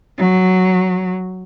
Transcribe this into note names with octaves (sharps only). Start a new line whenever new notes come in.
F#3